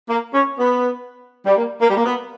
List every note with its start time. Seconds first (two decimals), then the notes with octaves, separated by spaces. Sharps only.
0.09 A#3
0.33 C#4
0.59 B3
1.45 G3
1.57 A#3
1.81 A#3
1.89 G3
1.96 A#3
2.05 B3